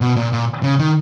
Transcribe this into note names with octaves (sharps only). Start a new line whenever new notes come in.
B2
A#2
A#2
C#3
D#3